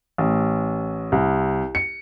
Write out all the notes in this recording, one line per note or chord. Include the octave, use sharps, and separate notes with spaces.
A1
C2
C#7